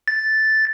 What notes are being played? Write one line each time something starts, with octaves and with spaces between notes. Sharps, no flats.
A6